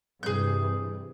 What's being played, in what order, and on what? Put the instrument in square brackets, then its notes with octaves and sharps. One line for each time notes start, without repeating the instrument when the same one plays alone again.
[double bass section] G2 C3 E3 [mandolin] G#4 G6